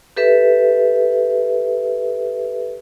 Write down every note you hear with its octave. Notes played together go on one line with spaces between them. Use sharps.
G4 A4 B4 E5